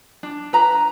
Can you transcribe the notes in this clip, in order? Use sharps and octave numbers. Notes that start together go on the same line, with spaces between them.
D4
B4 A#5